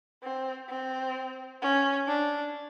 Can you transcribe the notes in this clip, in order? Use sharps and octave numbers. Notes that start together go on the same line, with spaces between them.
C4
C4
C#4
D4